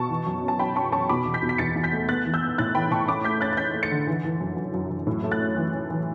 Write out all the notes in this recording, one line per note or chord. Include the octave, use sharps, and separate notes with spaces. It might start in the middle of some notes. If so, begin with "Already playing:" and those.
Already playing: B2 A5 C#6
E3
F#2
C#4
A5
C#4 G5 B5
C#4 A5 C#6
C#4 A5 C#6
B2 B5 D6
E2
G6 B6
B2
B6
E2 A6 C#7
E2
G6 B6
A3
B3 F#6 A6
E3
E6 G6
B3
A2 F#6 A6
E3 G5 B5
A2 A5 C#6
C#4 B5 D6
A3 G6 B6
C#4 F#6 A6
A6
C#4 G6 B6
A3
A6 C#7
D3
E3
E3
F#2
F#2
F#2
F#2
A2
A3
F#6 A6
C#4
E3
C#4
E3